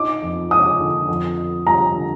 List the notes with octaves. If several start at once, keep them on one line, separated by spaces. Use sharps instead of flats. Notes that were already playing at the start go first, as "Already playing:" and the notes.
Already playing: D#4 D6
F2
G#3 D#6
D3
F2
F2
G3 A#5
D3